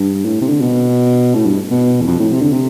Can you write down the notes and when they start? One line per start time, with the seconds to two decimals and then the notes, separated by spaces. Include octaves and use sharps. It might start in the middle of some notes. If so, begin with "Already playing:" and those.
Already playing: G2
0.25 A2
0.42 C3
0.49 D3
0.61 B2
1.35 A2
1.46 G2
1.71 B2
2.01 E2
2.07 F2
2.19 A2
2.32 C3
2.42 D3
2.53 C3